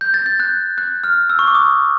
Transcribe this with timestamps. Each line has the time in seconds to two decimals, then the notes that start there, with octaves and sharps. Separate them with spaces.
0.01 G6
0.14 A6
0.26 G6
0.40 F#6
0.78 F#6
1.04 F6
1.30 E6
1.39 C#6
1.47 D6
1.55 D#6